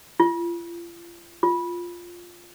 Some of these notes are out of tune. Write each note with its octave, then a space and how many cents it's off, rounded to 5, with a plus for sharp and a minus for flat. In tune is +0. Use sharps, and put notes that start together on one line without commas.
F4 -35
F4 +0